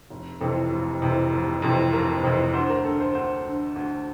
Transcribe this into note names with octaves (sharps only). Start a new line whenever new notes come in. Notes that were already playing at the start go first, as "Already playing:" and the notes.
F1
F2 C3 E3 A4
F1
F2 C3 E3
F1
F2 C3 E3
F1 A#4
F2 C3 E3
D2 C5
A#4
D3 A4
C5
D2 C5
D3
D2